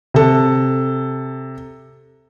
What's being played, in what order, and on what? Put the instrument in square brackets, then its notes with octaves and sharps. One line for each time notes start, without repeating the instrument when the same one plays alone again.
[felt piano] C3 A4